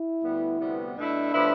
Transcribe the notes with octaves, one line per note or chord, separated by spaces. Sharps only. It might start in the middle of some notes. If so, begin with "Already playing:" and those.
Already playing: E4
D2 D3 G3 B3
D2 C3 G3 B3
B2 A3 D4 E4
A2 F3 B3 E4